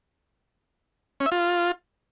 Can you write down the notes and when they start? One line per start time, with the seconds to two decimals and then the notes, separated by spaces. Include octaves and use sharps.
1.20 C#4
1.26 E5
1.32 F4